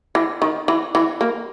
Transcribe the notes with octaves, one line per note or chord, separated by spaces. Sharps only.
E3
D#3
E3
E3
A#3